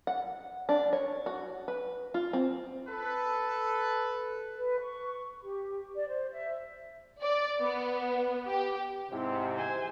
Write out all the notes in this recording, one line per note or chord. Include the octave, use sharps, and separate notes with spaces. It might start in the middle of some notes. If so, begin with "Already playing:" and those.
F#5
D4
C#5
F#4
B4
F4
C4
A4 B4
B4
C#6
G4
D5
C5
E5
D5
B3
G4
G#2 C3 E4
C5 G#5